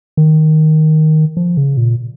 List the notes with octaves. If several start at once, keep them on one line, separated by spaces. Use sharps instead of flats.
D#3
F3
C#3
A#2